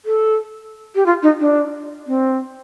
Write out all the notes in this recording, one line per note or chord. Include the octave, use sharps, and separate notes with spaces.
A4
G4
F4
D#4
D4
C4